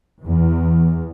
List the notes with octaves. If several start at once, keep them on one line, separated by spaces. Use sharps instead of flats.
E2